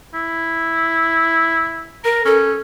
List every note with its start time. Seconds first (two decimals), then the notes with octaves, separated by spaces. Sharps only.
0.14 E4
2.04 A#4 A#5
2.25 C#4 A4